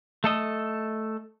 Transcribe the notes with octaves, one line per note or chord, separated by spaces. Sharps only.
A3 A4 D#5